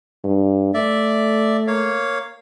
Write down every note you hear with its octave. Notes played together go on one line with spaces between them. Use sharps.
G2
A3 D5 E5
A#3 C#5 F5